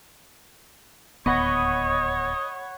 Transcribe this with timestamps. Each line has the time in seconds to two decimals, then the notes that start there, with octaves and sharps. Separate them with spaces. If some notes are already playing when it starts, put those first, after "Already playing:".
1.26 D1 D#2 B3 C#5 D#5 F#5 B5 C#6